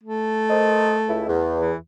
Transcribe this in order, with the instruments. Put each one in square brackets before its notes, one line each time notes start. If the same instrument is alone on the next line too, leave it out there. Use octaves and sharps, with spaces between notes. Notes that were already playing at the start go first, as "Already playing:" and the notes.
[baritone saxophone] A3
[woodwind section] A#4 C5 D#5
C#2 E4
E2
[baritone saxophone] E3